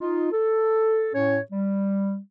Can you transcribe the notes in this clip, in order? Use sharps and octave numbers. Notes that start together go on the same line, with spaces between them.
D#4 F4
A4
A2 C#4 C#5
G3